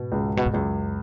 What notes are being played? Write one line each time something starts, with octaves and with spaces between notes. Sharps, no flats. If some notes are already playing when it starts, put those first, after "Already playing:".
Already playing: G#2 B2
C#2
B2
G#2
C#2 F#2